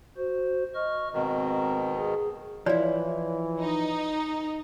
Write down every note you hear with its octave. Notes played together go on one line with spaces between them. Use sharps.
F#4 C5
D#5 C#6 F6
G#2 B2 D#3 C4
G#4
E3 F3 E4 C#5 D5
D#4